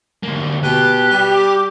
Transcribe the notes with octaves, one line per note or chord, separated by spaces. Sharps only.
D2 A#3
B2 G4 F#6
G3
D6